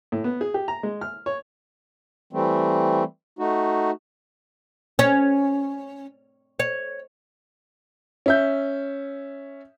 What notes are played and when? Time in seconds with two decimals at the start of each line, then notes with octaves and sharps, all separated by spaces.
0.12 A2
0.24 B3
0.41 G#4
0.54 G4
0.68 A#5
0.83 G#3
1.01 F6
1.26 C#5
2.33 E3 G3 A3 C4
3.39 A3 D#4 F#4
4.99 C#4
6.59 C#5
8.26 C#4 E5 G6